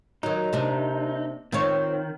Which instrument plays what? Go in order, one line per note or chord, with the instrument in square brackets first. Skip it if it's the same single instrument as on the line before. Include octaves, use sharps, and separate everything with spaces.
[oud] D#3 F#3 [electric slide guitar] D#4
[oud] C3 A#3 D4
[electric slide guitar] D#3 [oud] C4 F4 C#5